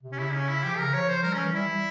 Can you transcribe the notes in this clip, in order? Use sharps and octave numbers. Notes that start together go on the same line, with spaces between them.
C3
C#4
C#3 E4
C#4
E4
F3 G4
C#3 A#4
F3 C#5
C5
G3 A#4
C#4
E3
G3 E4